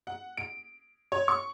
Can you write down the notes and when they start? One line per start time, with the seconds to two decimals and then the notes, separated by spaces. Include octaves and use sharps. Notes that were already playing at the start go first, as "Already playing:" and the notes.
0.07 F#5
0.37 D7
1.12 C#5
1.28 C#6